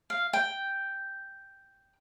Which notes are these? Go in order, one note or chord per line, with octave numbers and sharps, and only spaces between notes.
F5
G5